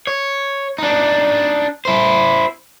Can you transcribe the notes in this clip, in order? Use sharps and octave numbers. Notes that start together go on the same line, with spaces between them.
C#5
D4 D#4
E4 C5